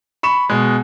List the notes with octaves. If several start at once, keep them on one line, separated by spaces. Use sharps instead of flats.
B5 C#6 E7
B2 G#3